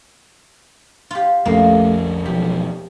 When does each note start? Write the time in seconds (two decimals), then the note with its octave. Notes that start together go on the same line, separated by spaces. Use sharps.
1.11 F4 G4
1.45 A#1 F2 A3 A#3 C#4
2.26 E1 B1 F3 G4